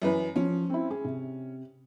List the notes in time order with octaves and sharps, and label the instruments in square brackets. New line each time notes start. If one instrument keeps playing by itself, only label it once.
[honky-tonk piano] F#2 E3 B4
[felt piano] F3 [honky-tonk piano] C#4
[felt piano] C4 E4
G#4
C3